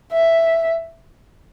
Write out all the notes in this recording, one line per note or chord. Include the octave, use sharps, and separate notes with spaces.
E5